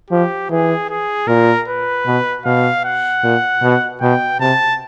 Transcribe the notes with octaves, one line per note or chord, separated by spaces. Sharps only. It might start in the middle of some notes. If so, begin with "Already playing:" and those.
F3 G4
E3 G#4
G#4
A#2 A#4
B4
B2
B2 F5
F#5
A#2
B2
B2 G5
C3 A5